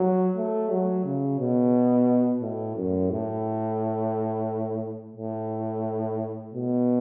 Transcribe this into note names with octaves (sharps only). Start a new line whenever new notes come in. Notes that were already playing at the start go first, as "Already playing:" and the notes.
Already playing: F#3
A3
F#3
C#3
B2
A2
F#2
A2
A2
B2